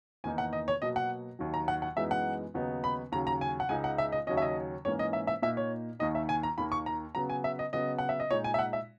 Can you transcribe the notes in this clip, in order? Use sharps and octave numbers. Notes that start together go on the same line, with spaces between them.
E2 D#3 A#3 D#4 G#5
F#5
D#5
C#5
B2 F#3 A#3 D#5
F#5
D#2 D#3 F#3
A#5
F#5
F#5
F#2 E3 G#3 B3 D#4 E5
F#5
D#2 C#3 F#3 B3 D#4
B5
D#2 C#3 F#3 A#5
A#5
G#5
F#5
C#2 C#3 G#3 D#4 G#5
F#5
E5
D#5
D#2 C#3 F#3 C#4 D#5
E5
D#5
G#2 E3 A#3 C#4 C#5
D#5
E5
E5
A#2 A#3 D#4 E5
C#5
D#2 D#3 A#3 D#4 D#5
E5
G#5
A#5
D#2 D#3 A#3 B5
C#6
A#5
C#3 F#3 B3 A#5
G#5
E5
D#5
C#3 F#3 B3 D#5
F#5
E5
D#5
A#2 G#3 D#4 C#5
G#5
E5
F#5
E5